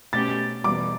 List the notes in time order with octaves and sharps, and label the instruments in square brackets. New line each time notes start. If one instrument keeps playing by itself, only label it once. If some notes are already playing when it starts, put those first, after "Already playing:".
[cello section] B2 A3 C#4 G4 [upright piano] A6
[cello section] E2 B2 G3 [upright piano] D6